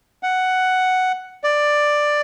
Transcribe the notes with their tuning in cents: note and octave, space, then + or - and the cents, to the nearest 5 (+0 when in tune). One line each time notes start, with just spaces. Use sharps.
F#5 +5
D5 +10